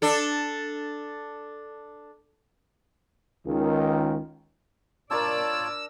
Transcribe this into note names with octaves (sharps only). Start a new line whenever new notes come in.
D4 A4
C#2 D#3
D4 F4 A#4 C#5 D5 A5 E6